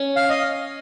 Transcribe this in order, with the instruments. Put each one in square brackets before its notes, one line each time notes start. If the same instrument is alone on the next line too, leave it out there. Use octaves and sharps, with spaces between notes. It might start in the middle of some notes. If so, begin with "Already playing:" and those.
Already playing: [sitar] C#4
[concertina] F5
D#5